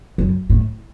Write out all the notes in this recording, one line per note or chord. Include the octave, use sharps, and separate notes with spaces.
F#2
A2